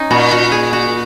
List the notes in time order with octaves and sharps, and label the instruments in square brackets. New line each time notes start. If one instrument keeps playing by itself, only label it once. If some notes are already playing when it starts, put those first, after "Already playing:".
Already playing: [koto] C#4 D#4
[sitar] A#2 [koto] F#4
[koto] F#4
G#4
F#4